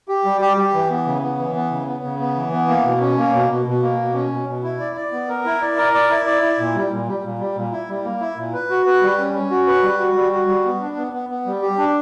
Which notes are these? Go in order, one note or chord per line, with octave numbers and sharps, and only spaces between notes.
G4
G3
G4
G4
E3
B3
C#3
B3
E3
B3
C#3
B3
C#3
B3
E3
B3
A#3
B2
C#4
A#3
B2
B2
B2
A#3
B2
C#4
B2
B2
E4
D5
D5
B3
A#4
E4
D5
A#4
D5
E4
D5
E4
A#2
G3
A#2
G3
A#2
G3
A#2
E4
G3
A#3
E4
A#2
B4
F#4
B4
G3
C#4
C#4
F#4
B4
G3
F#4
G3
F#4
G3
B3
D4
B3
B3
B3
G3
G4
D4